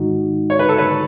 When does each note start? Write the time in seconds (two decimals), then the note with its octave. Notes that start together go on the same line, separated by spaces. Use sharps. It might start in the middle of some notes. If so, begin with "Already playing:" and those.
Already playing: G#2 D#3 G#3 D#4 F#4
0.50 C#5
0.59 B4
0.69 A4
0.78 B4